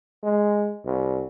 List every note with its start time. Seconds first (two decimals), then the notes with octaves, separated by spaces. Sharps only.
0.23 G#3
0.85 C2